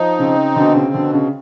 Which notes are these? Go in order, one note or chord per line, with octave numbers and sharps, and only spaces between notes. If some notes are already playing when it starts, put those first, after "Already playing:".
Already playing: F3 D#4
C#3 C4
B2 D3
C#3
B2 D3
C#3